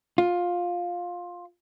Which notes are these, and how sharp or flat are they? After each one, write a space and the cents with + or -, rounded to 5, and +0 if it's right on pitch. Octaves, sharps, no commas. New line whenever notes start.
F4 +15